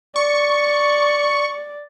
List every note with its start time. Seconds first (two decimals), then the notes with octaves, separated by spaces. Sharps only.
0.16 D5 C#6